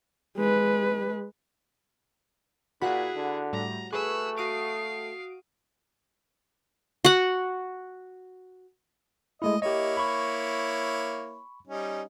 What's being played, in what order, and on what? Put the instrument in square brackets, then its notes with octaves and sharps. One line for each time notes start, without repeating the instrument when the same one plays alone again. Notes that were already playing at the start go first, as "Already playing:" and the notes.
[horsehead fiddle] G#3 B4
[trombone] A#2 [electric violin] E4 G#4 [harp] F#4 [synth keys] F#5 B5
[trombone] D3
[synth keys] A2 G3 [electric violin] A#5
[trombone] A3 [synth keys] G#4 B4 [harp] C#6 [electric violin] E6 F#6
[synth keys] F#4 D#6 D7 [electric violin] F5 C7
[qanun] F#4 F#5
[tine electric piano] G#3 A3 E4 [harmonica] D#5
[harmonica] A#3 E4 C#5 [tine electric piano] G4 D#5
[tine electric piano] B5 C#6
[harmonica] G3 C#4 D#4